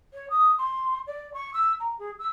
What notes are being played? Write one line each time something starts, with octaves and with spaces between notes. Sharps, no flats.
C#5
D#6
C6
D5
C#6
E6
A#5
G#4
E6